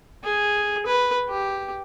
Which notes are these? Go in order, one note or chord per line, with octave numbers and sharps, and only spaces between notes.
G#4
B4
G4